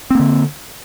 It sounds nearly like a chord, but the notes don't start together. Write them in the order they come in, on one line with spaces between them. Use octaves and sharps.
C4 A#3 D3